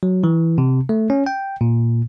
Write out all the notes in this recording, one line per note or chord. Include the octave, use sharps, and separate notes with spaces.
F#3
E3
C3
A3
C#4
G5
A#2